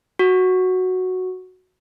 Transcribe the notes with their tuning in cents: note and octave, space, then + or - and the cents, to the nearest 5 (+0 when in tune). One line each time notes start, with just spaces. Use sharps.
F#4 -5